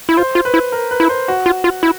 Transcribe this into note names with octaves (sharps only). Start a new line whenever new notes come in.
E4
F4 C5
F4
B4
E4
A#4
B4
E4
C5
F#4
F4
F4
E4